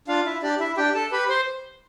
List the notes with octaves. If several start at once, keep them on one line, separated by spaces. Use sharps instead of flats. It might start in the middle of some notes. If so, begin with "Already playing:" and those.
D4 F4 F5
E4 E5
D4 G4 D5
E4 E5
D4 G4 G5
A4 A5
G4 B4 B5
C5 C6